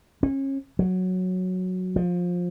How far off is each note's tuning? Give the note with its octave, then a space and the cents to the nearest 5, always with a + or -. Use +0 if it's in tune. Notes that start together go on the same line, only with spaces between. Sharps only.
C#4 -30
F#3 -5
F3 +20